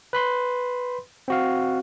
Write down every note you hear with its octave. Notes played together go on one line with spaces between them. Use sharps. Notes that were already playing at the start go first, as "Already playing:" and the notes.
B4 B5 C6
C4 F#4 F5